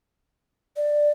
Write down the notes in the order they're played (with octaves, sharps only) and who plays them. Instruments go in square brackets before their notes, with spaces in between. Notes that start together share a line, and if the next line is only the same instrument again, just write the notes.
[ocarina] D5